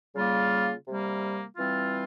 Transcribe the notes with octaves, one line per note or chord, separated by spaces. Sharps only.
C#3 G3 A#3 F4
C3 G3 A#3
E3 G3 C4 F4